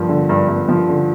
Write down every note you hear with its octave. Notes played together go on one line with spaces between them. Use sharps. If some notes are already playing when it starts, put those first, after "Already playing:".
Already playing: G2 F3
D3
G2
G2
F3
D3